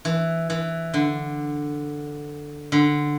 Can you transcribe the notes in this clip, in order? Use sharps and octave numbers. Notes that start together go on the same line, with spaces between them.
E3
E3
D3
D3